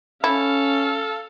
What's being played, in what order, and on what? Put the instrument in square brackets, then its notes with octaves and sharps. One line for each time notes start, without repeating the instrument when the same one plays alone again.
[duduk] C#4 [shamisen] E4 [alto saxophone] A4 [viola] F5